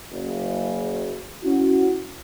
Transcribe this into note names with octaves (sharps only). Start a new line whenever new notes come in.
F#1 C#3
C#4 E4 F#4